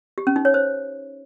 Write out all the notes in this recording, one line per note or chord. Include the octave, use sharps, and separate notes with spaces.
G4
C#4
D#4
C#5
C5